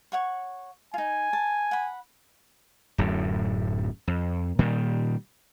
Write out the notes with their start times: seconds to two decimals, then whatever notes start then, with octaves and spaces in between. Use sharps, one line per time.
0.12 C#5 F#5 C#6
0.94 D#4 F4 G#5
1.33 A5
1.71 F#5 B5
2.98 D1 F#2 A2
4.07 F2
4.59 A#2 D#3 G3